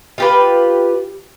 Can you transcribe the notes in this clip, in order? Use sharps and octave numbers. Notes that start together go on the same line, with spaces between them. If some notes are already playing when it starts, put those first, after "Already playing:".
F4 G4 B4